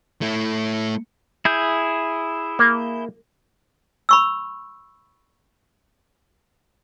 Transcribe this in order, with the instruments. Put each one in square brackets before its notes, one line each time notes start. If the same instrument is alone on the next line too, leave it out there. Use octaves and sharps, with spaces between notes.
[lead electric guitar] A3 E4
[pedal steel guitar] E4 G#4 G6
[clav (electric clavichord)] A#3
[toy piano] B5 C#6 E6